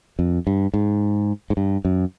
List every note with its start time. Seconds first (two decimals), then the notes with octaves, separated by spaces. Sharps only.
0.19 F2
0.47 G2
0.74 G#2
1.50 G#2
1.57 G2
1.85 F#2